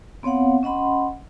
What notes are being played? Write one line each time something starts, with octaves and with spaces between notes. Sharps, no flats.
B3 C4 C#5 F5 F#5
C#4 D#5 F#5 B5 C6